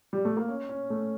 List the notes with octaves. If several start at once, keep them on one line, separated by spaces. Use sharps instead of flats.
G3
A3
A#3
C#4
C#4
A3